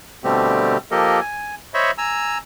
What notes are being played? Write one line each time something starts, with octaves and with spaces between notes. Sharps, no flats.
B2 D3 G3 A3 C4 G4
F3 A#3 G4 A4 A#4 D#5
G#5
C5 C#5 D#5 E5 B5 C#6
G#5 A#5 E6